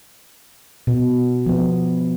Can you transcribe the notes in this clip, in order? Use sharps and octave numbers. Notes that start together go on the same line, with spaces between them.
B2
F3 B3